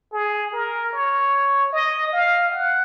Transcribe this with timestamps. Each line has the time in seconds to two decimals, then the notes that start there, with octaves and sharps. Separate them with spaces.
0.13 G#4
0.53 A#4
0.93 C#5
1.72 D#5
2.12 F5
2.52 F#5